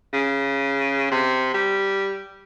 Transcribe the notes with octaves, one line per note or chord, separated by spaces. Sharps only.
C#3
C3
G3